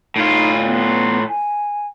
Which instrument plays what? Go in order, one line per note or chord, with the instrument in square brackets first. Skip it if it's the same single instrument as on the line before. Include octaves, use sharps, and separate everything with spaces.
[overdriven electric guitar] A2 F4 [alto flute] D#4
[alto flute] B3
G#5